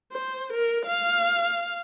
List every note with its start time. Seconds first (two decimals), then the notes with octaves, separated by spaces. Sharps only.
0.12 C5
0.53 A#4
0.86 F5